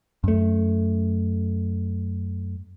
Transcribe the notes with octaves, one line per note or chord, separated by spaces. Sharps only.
F#2 A3